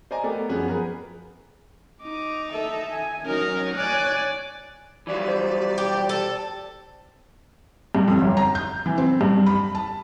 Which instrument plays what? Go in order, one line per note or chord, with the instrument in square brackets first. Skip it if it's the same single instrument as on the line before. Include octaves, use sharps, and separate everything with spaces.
[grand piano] C5 D5 D#5 G#5 A#5
A3 B3 A4 A#4 D5 G5
F#2 F3 B3 C#4 G#4 F#6
G#4 A#4 B4
[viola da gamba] D#4 [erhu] D6
[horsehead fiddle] A4 [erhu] E5
[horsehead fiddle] G#5
[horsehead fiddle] F#3 C#4 [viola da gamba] D#4 A#4 [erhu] F6
[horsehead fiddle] C#5 G#5 [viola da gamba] D5 [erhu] F#6
[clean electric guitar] E3 F#3 G3 [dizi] D5
[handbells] C5
[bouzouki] G4
A4
[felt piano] G2
F2
G1
A#5
G6
E3
C4
G2
B5
A5